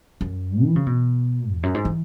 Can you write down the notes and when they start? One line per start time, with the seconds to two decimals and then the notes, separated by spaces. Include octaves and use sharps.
0.21 F#2
0.65 E3
0.76 C#3
0.87 B2
1.53 E2
1.63 F#2
1.75 G#2
1.85 E3